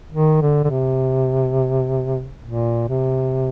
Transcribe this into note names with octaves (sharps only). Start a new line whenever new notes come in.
D#3
D3
D3
C3
A#2
C3